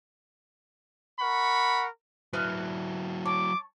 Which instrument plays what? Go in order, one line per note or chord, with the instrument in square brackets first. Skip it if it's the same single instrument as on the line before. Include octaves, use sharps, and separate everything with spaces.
[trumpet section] A#4 F#5 B5 C#6
[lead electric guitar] F#3 E4 [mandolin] B4 D5 F6
[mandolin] C#5 A5 [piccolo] D6